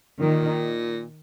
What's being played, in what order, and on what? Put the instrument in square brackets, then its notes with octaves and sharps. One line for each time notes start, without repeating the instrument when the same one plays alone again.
[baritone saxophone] A#2 [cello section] D#3